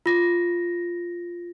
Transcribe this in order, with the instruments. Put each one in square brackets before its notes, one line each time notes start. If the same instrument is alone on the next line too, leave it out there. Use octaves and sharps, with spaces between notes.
[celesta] F4 A#6